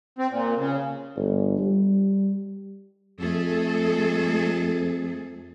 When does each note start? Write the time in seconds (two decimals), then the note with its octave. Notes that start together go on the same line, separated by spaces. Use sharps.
0.19 C4
0.31 A#2
0.58 C#3
1.16 G1
1.59 G3
3.20 F2 A3 G#4 A4